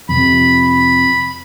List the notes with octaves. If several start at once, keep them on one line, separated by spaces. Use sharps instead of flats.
F2 C3 B5